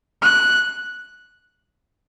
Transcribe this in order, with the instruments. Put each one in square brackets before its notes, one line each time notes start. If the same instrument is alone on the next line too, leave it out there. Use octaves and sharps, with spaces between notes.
[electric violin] F#6